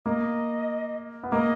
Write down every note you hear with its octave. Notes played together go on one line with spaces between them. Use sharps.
A#3 D#5
B3
A#3 D#5